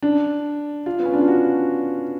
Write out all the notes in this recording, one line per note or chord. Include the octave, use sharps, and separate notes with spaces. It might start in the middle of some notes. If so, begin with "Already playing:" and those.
D4
F4
B3
C#4
D4
F4
F#4